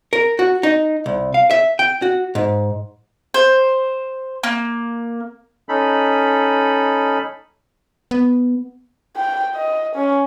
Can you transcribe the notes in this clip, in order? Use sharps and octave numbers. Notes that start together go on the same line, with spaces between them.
A#4
F#4
D#4
C2
F5
E5
G5
F#4
G#2
C5
A#3
C#4 D#4 A4 B5
B3
G5
D#5
C#4